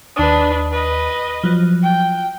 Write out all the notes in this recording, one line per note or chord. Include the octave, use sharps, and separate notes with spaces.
D#2 D4 B4 D#6
B4 D#5
F3 F#3
G5